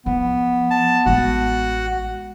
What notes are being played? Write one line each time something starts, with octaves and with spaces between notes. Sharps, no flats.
F3 B3
A5
A1 G#3 F#4